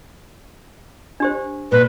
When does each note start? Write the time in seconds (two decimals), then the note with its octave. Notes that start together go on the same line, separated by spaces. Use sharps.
1.20 D4 G4 C5
1.72 A#2 B4